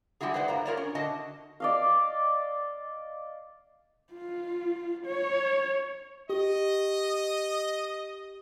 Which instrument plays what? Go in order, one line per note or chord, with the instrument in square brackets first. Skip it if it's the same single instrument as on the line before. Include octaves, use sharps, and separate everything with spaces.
[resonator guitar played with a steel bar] G3 G#3 E4 F#4 G#4
G#4 B4 C5 D5 F#5
G2 A#3 F4 A#5
F4 A#4 C#5 D5
C#4
D3 F#4 D#5 A5
[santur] D5 D#5 F5
[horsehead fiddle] F4
C#5
[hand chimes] G4 [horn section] D#5